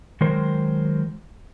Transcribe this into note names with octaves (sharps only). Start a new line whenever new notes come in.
D#3 F#3 G#3 A#4 C5